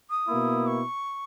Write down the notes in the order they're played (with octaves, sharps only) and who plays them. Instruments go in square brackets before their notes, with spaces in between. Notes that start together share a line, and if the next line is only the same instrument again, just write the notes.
[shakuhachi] D#6
[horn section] B2 A#3 E4
[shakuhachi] C#6